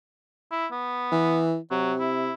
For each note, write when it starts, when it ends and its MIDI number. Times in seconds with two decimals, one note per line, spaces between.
0.51 0.67 64
0.71 1.44 59
1.12 1.58 52
1.71 2.31 48
1.71 1.94 54
1.99 2.34 64